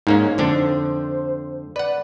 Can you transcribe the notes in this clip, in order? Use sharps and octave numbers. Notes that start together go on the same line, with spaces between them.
G#2 A#3 C#4 D#4
F2 D3 D4 C5
B4 D5 F#5